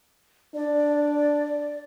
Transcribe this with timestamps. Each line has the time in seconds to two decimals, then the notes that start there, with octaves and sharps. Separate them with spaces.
0.55 D4 D5